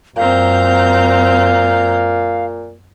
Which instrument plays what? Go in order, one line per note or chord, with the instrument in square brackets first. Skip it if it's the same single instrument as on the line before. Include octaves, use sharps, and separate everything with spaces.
[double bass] F#2 [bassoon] A#2 [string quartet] C4 A#5 G6 [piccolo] F5